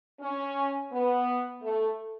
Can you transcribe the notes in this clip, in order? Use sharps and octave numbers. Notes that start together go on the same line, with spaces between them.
C#4
B3
A3